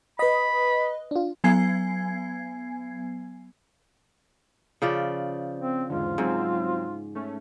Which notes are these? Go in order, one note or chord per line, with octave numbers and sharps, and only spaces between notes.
B4 D#5 B5
D4 F4
F#3 B3 G#5 G#6 C7
C#3 F3 D5
C4
E2 G#2 D3 F4
G#2 F#3 C4
A3 C#4